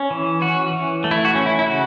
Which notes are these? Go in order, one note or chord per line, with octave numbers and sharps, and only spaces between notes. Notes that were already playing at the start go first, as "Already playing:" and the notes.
Already playing: C#4
E3
C#4 F#4
E3
A3
E4
F#4
C#4
E4
E4
C#3 F#4